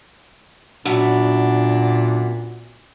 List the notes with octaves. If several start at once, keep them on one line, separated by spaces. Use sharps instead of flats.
F#2 A#2 B3 D4